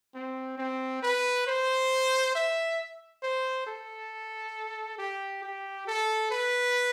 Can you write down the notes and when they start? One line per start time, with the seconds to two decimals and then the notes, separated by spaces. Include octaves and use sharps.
0.15 C4
0.58 C4
1.03 B4
1.47 C5
2.35 E5
3.23 C5
3.67 A4
4.98 G4
5.43 G4
5.88 A4
6.31 B4